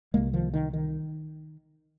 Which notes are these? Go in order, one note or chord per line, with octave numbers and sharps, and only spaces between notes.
C2 C3 G#3 A#3
D#3 F3
D#3
D#3